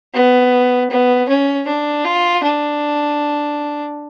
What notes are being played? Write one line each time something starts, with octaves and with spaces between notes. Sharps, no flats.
B3
B3
C#4
D4
F4
D4